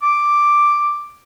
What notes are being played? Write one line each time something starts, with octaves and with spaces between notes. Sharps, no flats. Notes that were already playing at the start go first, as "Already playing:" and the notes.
D6